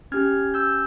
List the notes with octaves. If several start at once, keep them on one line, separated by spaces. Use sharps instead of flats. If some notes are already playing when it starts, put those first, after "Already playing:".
C#4 G4 F6 G#6
E6 G6